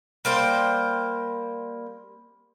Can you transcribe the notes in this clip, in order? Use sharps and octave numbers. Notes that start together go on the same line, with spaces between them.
G3 A#3 C5 G5